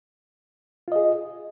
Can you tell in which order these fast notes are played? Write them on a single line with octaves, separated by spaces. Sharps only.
F4 D#5 G#4